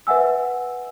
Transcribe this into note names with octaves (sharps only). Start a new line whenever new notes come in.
B4 E5 F#5 G#5 E6